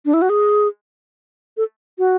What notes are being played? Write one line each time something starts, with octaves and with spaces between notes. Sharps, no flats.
D4
E4
F#4
G#4
A4
F#4